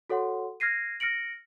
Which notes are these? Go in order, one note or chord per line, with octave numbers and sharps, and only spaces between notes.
F#4 A4 C#5 F#5 C6
F6 G#6 A#6 C7 D#7
F6 A#6 C#7 D7 F#7